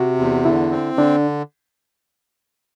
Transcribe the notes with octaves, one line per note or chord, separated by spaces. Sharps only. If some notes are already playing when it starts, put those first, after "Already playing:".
Already playing: C3 F#4
E2
D3 E4
C4
D3 D4